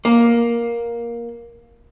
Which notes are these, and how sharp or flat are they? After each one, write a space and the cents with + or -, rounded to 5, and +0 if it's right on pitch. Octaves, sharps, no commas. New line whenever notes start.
A#3 +10